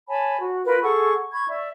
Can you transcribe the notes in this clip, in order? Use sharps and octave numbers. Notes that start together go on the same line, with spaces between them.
C#5 G#5 A5 B5
F#4
F4 A#4 B4
G#4 A4 F#5 C#6
B5 C#6 G#6
D5 E5